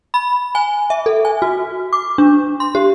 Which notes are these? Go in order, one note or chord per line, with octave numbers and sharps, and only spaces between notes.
B5
G#5
E5
A4
G#5
F#4
D6
D4
C6
G4